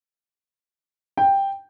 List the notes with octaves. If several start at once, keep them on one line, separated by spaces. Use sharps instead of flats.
G5